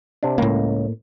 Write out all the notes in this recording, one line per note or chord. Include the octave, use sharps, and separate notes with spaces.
C3 D4
C#2 A2 A#3